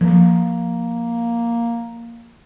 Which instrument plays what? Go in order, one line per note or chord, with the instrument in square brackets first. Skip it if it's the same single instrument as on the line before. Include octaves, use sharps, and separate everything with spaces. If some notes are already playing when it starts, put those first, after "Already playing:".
[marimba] F3 [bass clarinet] A#3